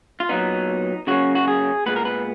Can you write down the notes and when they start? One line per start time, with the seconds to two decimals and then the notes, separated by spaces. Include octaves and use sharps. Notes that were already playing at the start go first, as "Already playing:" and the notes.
0.20 F4
0.29 A#2 F#3 B3 D#4
1.07 C#3 F#3 A#3 C#4 F#4
1.35 F#4
1.48 G#4
1.86 A#2 G#3 B3 B4
1.96 A#4
2.05 B4